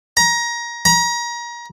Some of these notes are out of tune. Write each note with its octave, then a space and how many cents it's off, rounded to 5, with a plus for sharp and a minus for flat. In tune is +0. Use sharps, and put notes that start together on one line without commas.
A#5 +20
A#5 +30